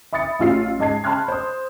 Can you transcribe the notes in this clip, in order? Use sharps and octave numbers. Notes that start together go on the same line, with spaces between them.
E5 B5 D#6 A6 C#7
A1 D#4 F4 E6 C7
G#2 D#5 A5 G#6 C7
A5 B5 C6 F6 F#6 G#6
C5 D#6